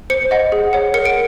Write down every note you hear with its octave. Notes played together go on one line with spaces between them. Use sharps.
C5 C#7
D#5 F#5
G#4
C#5 F#5
A#4 C#7
D7